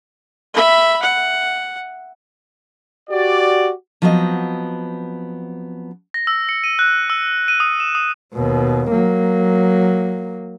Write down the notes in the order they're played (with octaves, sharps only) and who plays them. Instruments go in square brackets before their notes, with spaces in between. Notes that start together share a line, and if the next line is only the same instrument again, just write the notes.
[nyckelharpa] E5 B5
F#5
[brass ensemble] F#4 G4 D5
[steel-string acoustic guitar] F3 F#3 B3 C4 A#4 D#5
[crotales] A#6
E6
C#7
D#7
F#6
E6
D#7
D#6
E7
D#6
[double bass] D#2 B2
F#3 A#3